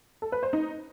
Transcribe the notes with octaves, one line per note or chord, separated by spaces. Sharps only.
A4
B4
C5
D#4